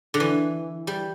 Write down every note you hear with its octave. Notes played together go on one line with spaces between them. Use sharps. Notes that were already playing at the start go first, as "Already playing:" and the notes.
D3
E3
G3